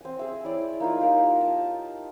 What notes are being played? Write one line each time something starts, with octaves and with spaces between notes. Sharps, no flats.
C4 G#5
G#4 E5
E4 C#5 D5
A#3 D#4 F4
G4 A#4
A5